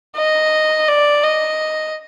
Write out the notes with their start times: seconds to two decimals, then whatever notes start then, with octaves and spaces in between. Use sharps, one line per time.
0.17 D#5
0.88 D5
1.23 D#5